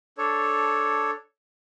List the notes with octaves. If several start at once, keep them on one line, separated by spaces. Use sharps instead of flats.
D4 A4 C#5